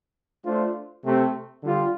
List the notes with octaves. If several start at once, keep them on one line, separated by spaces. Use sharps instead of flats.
A3 D4 F4 C5
C3 A3 C4
D3 G3 F4